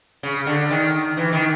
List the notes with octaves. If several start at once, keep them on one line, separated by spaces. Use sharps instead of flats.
C#3
D3
D#3
E3
D#3